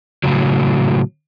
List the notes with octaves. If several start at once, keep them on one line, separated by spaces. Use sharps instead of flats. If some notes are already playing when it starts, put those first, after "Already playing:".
A2 C#3 F#3